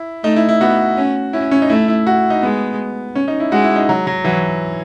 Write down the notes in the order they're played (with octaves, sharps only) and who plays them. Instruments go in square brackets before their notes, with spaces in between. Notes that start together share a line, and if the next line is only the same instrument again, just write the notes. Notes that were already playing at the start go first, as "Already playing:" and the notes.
Already playing: [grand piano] E4
[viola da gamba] A3 [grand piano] D#4
[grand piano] E4
E4
[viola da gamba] B3 [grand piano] F#4
[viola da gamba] C#4
[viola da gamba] C#4 [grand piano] E4
[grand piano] C#4
D#4
[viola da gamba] A3 [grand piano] E4
[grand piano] E4
F#4
D#4
[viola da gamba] G#3 [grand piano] B3
[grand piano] C#4
D#4
E4
[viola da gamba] G#3 [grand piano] F#4
[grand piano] E4
D#4
F#3
F#3
[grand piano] E3 [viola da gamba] F#3